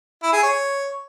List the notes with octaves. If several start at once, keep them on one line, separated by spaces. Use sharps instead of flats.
E4
G#4
C#5